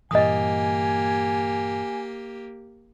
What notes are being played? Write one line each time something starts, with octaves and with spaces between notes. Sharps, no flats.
G2 A#2 E3 A#3 G4 D#5 G#5 D#6